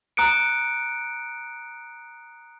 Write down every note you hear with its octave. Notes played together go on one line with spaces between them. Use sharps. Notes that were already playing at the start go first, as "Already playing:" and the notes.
A#5 D#6 F#6 C#7 D7